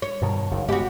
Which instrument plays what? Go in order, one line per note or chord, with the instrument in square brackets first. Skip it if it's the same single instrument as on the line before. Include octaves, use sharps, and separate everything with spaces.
[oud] C#5
[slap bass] G2 B2 D#3
F#1 G2 D#3
[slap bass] G#3 B3 [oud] F#4 G4